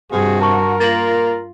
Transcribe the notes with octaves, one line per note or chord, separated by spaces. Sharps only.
G2 C3 F#4 G#4
A#4 A5 C#6
A#3 F4 A6 A#6 F#7